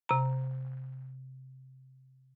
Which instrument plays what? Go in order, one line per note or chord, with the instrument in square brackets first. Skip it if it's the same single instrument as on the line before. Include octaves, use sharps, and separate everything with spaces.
[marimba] C3 A#5